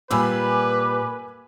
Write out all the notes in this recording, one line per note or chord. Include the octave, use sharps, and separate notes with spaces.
A#2 G3 B4 G#5 B5 D6 E6